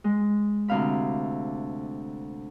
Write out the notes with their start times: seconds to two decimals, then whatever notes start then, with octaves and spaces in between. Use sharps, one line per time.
0.04 G#3
0.68 D2 C3 F5 B5